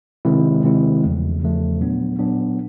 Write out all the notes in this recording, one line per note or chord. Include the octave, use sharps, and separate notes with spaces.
C3 D#3 G#3 C4 E4
C3 D#3 G#3 C4 E4
E2 C#3 F3 A3
E2 C#3 F3 A3
A#2 F#3 B3 D4
A#2 F#3 B3 D4